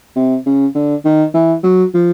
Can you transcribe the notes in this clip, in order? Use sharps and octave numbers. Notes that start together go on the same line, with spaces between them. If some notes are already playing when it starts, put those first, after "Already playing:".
C3
C#3
D3
D#3
E3
F#3
F3